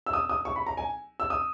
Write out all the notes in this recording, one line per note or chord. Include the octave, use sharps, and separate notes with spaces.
E6
D#6
D#6
C#6
B5
A#5
G#5
E6
D#6